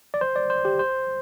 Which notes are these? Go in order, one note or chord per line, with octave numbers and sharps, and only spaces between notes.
D5
C5
D5
C5
G4
C5